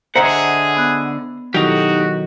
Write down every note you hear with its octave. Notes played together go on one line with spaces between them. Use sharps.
D3 G#4 C5 D#5 E5 F#5 A#5
B3 F#6
B1 D#3 F#3 D#4 E4 F#4 G4 A4